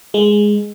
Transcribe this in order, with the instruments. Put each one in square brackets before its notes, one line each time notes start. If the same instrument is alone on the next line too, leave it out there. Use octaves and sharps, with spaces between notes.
[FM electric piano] G#3